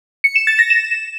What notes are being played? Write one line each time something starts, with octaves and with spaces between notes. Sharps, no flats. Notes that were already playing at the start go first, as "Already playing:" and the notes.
C#7
E7
A6
A#6
E7